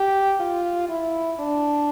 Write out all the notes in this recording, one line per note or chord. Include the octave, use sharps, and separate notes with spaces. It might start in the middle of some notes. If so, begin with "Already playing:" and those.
Already playing: G4
F4
E4
D4